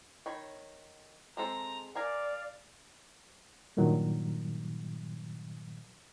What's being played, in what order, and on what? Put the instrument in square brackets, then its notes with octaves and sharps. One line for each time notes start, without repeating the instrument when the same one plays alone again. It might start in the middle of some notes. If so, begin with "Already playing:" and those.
[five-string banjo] D#3 C#5 B5
[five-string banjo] G#3 C4 A4 [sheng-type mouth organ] A#5
[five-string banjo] A#4 G#5 A#5 [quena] D5 [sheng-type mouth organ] F5
[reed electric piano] G2 A#2 D#3 F#3